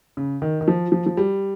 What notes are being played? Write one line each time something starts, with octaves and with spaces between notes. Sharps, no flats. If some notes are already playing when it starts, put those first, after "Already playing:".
C#3
D#3
D#3
F3
F3
F3
G3